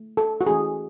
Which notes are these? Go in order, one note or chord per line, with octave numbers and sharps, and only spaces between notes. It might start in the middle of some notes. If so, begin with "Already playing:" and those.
Already playing: A3
A4
F#4
E3 A3 C#4 G#4